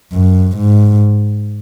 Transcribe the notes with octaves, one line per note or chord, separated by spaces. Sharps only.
F#2
G#2